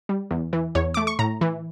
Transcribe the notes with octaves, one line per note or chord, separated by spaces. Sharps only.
G3
E2
E3
E2 C#5
A3 D6
C#6
A2 A#5
E3